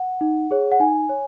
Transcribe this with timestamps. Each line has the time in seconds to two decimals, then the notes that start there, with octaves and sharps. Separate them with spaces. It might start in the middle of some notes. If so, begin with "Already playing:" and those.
Already playing: F#5
0.21 D#4
0.51 G#4 C#5
0.72 F#5
0.80 D#4 G#5
1.09 C#5